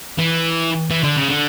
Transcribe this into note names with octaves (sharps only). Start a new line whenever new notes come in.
E3
E3
D3
C#3
D3